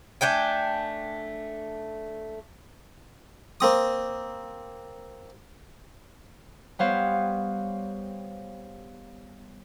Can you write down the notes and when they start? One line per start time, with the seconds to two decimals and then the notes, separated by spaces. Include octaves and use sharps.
0.21 A3 D4 G5 G#5
3.60 A#3 C4 D#6
6.79 G3 B3 C5 C#5 F5